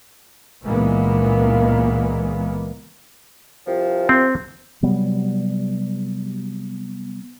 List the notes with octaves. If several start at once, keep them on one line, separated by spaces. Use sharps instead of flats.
C#2 A#2 E3 G#3 A#3 B3
C2 C3 F3
C4
C3 F#3 G3 B3